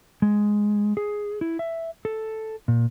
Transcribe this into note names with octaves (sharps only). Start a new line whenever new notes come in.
G#3
G#4
E4
E5
A4
A#2